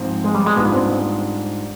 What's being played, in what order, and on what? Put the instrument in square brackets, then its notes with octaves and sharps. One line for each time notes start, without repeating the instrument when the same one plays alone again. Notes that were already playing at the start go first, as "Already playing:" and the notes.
Already playing: [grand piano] G#2 F3 C4
[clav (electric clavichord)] G#3
G3
G#3
[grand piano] G#2 G3 D4 F4 [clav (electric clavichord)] B3
[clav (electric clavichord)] C4